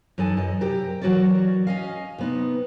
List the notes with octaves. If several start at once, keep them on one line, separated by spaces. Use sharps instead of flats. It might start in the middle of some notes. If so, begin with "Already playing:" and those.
F#2 E3 D#4 A4 G#5
F#2 D#5
C3 G4 A#4
E3 F#3 F#4 A#4 C#5 D5
C#4 D#5 F5
C3 B3 D#4